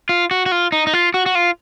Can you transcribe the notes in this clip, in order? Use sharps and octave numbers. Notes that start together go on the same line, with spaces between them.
F4
F#4
F#4
F4
D#4
D#4
F4
F#4
F#4
F4